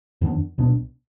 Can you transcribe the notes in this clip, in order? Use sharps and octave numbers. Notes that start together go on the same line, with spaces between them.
F2 D#3 B3 D4
C2 B2 B3 D4